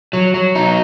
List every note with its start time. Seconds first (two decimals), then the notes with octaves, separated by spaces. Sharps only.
0.13 F#3
0.34 F#3
0.55 D#4